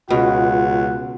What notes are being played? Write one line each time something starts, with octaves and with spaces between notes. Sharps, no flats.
C#2 B2 F4 F#5